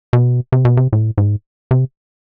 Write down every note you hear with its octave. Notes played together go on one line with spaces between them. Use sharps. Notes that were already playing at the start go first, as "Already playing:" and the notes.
B2
C3
B2
C3
A2
G#2
C3